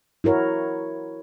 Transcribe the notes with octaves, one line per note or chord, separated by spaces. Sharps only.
E4 F#4 A#4 C#5